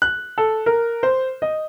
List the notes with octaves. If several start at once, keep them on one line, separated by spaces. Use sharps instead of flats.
F#6
A4
A#4
C5
D#5